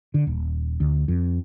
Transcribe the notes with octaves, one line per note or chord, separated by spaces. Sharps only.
D3
D#1
D2
F2